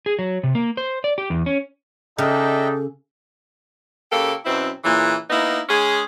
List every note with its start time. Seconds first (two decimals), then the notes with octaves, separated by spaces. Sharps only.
0.06 G#4
0.19 F#3
0.43 C3
0.55 A#3
0.77 C5
1.04 D5
1.18 G4
1.30 E2
1.46 C#4
2.18 C#3 D4 D#4 A4 D#5 E5 G5
4.11 C#3 A#3 G4 A4
4.45 F#2 B2 C4 E4
4.84 A#2 C#3 E3
5.30 A#3 B3 D#4 E4
5.68 G#3 C#4 G#4